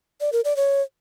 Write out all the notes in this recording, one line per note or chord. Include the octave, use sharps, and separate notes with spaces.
D5
A#4
D5
C#5